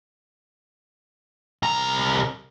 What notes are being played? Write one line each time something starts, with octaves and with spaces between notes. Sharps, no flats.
C2 A#5